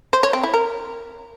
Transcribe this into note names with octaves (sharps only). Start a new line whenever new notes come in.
C5
C#5
C4
E4
A#4